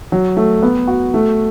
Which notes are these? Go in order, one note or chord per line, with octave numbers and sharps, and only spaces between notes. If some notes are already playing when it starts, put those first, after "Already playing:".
F#3
A3
B3
F#4
A3